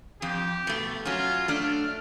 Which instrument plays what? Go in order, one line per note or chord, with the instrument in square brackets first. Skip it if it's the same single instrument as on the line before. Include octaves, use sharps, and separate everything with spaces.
[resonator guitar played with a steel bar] F2 [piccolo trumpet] G4
[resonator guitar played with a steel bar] B2 A3
[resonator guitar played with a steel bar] F#3 C#4 [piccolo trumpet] F4
[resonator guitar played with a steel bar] A3 D4 [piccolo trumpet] F6